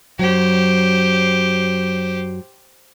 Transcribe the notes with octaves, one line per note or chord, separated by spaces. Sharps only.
F#2 F#3 G4 C5